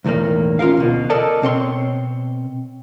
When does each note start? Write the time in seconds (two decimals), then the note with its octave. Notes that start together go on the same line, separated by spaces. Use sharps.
0.05 B1 E2 A2 D#3 A#3
0.59 C#4 F4 G#4 A#4 F5
0.77 D2 B2
1.10 A4 A#4 D5 D#5 A5
1.42 B2 C4 C#5 C6